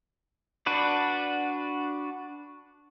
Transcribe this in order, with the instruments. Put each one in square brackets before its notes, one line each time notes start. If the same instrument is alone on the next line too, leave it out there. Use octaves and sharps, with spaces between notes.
[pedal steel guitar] D4 F#4 B4 D5